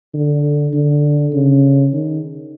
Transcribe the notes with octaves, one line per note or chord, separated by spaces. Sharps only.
D3
D3
C#3
D#3